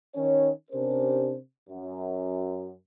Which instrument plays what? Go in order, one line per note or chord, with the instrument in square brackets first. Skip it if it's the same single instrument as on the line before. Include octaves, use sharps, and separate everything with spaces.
[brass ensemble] D#3 C#4 C#5
C3 C#4 D4 G4 A#4 C5
F#2